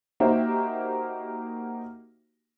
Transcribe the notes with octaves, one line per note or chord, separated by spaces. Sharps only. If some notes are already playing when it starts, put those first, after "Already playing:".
A#3 D#4 F#4 G4 C5 E5